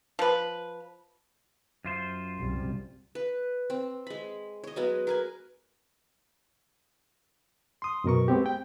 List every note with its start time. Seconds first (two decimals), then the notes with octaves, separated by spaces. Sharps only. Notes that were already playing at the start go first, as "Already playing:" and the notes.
0.19 F3 B4
1.85 F#2 F4 C5
2.39 C2 C3 G3
3.15 B4
3.70 C4
4.07 G#3 B5
4.64 C#5 D#5
4.76 F#3 G#3 B3 F#4
5.07 A#4 B4 G#5
7.82 C6 D#6
8.04 F#2 B2 A#4 C#6
8.28 G#3 B3 C4 G4
8.46 G5